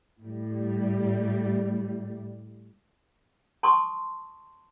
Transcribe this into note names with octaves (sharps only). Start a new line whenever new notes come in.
A2 G3
A5 C6 C#6 D#6